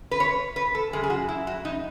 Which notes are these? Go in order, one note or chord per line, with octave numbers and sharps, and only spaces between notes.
B4
C#5
B4
A4
F#2 C#3 G#3 G#4
G#4
F#4
E4
F#4
D#4